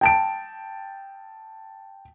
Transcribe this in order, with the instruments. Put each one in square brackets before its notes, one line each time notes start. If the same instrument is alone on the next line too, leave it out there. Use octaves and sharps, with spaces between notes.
[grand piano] G5 A5 D7